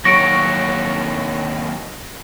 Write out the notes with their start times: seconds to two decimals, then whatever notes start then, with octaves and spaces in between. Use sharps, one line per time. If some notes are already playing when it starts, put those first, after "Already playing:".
0.05 D#2 F#3 C#6 A#6 D7